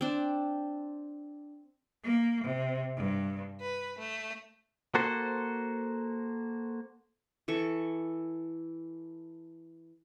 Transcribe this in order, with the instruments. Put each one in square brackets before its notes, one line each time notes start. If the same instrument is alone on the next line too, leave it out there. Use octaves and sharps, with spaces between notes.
[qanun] C4 D4
[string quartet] A#3
C3
G2
B4
A3
[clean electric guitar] A#3 F#4 A4 C5
[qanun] E3 A4 C#6